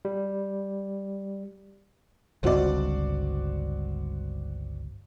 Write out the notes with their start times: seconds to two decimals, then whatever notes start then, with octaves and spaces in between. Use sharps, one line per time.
0.05 G3
2.43 G1 C#2 G2 C4 F#4 D5